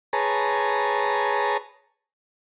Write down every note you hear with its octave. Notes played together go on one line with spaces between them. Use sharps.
G#4 B4 C#5 A5 A#5